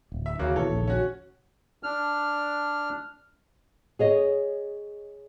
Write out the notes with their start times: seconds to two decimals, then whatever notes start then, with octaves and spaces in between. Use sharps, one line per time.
0.12 D1
0.26 E5
0.39 D#2 C#3 F#3 A#3 F#4
0.56 B2 E3 A4 C#5
0.70 A#1 D#2 C#3
0.87 C#4 F#4
1.83 D4 F6
3.99 G#4 C#5 D#5